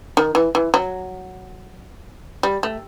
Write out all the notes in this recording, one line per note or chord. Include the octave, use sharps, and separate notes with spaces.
D#3
E3
E3
F#3
G3
A3